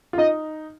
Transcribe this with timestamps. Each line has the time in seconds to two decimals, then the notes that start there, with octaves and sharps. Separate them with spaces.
0.13 F4
0.18 D#4 D#5